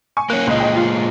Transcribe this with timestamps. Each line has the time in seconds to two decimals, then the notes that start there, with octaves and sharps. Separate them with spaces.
0.17 G#5 C#6
0.30 A#3 C#4 F#6
0.47 C#2 A#2 G#3 D#5
0.60 D#5 G5
0.76 F4